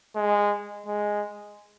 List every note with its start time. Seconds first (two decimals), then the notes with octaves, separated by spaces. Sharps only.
0.16 G#3
0.87 G#3